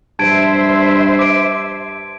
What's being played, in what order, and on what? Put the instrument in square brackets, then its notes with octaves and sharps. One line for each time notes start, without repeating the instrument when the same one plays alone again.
[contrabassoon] G2 [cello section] C5 E5 [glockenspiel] A5 G#6 D7
[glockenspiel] D6 D7